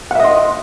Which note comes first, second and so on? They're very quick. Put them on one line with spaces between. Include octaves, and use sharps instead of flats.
F#5 E5 D#5 C6